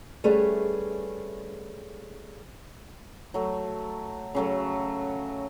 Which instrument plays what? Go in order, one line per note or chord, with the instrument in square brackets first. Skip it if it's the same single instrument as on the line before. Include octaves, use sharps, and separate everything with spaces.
[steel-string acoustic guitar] G3 A3 C#4 G#4 B4
[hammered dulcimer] F#3 A3
C#3 F#3 A3